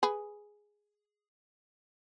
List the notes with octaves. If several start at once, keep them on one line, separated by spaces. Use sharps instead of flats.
G#4 B4